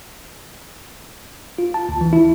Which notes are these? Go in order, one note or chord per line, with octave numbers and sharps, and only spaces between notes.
F4
A5
D2
E3
E4